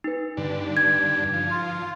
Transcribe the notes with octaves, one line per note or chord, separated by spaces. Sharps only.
D#4 B4
G2 D3
G#6
F3
F4